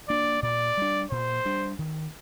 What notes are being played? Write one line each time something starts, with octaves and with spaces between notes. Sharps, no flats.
A#3 D4 D5
A#2 D5
G3 D4
A#2 C5
G3 D4
D#3